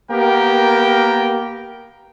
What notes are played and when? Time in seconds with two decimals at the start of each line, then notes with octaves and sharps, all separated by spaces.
0.11 A#3 B3 G4 A#4 G5